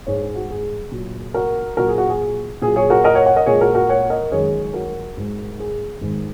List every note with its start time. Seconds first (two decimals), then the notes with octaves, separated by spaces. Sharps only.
0.07 G#2 G#3 G#4 C#5
0.22 G#4
0.36 F#4
0.50 G#4
0.92 A#2 F#3
1.34 F#4 A#4
1.77 A#2 F#3 F#4 A#4
1.88 G#4
1.98 F#4
2.09 G#4
2.62 A#2 F#3 G#4
2.76 G#4 C#5
2.90 F#4 A#4
3.04 A#4 D#5
3.15 C#5 F#5
3.26 C#5 F#5
3.36 A#4 D#5
3.46 A#2 G#3 G#4 C#5
3.61 F#4 A#4
3.75 F#4 A#4
3.89 C#5 F#5
4.10 A#4 D#5
4.32 F#2 D#3 G#3 G#4 C#5
4.74 F#4 A#4
5.17 G#2 G#3
5.60 G#4
6.01 G#2 D#3 G#3